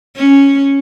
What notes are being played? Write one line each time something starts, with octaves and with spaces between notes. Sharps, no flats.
C#4